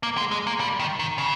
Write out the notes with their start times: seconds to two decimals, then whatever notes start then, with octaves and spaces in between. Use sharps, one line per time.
0.03 A#3
0.17 G#3
0.31 G#3
0.47 A#3
0.60 G3
0.79 D#3
0.99 D#3
1.18 C#3